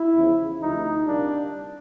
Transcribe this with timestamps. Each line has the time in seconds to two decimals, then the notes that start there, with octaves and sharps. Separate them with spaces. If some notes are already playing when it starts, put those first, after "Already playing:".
Already playing: E4
0.16 E2 C#3 F3
0.61 D2 C3 F3 A3 D#4
1.06 C2 A#2 G3 A#3 D4